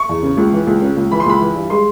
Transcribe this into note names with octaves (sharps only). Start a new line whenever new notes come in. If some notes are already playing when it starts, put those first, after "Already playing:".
Already playing: C#6
E2
C#3
C#2
E3
C#2
C#3
C#2
E3 B5
C6
C#2 B5
E3
G2
G#3 C6